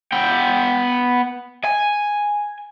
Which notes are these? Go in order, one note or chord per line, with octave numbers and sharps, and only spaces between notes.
B3 G5
G#5